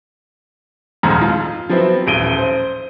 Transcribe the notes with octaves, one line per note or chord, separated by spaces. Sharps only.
D#1 F2 G#2 D#3 A#5
F4
F3 F#3 B3 C4 E4
D#1 A1 D7 D#7 G7
C5